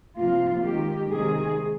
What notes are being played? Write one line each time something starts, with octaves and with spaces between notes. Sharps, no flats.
C3 F3 A#3 F4
D#3 G#3 G4
C3 D#3 G#3 G#4